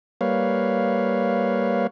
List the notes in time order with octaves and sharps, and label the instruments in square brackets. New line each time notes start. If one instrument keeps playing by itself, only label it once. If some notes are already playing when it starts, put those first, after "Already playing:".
[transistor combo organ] G3 A#3 B4 C#5 F5